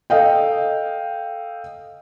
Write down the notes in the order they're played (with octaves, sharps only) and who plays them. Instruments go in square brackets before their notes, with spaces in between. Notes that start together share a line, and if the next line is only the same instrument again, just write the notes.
[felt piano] A4 D#5 F5 G5